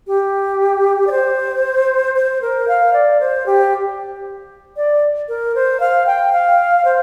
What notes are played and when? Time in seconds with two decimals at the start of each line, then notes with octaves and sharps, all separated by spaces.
0.07 G4
1.07 D5
1.11 C5
2.16 C5
2.41 A#4
2.68 F5
2.93 D5
3.20 C5
3.46 G4
4.76 D5
5.28 A#4
5.55 C5
5.80 F5
6.06 G5
6.33 F5
6.85 C5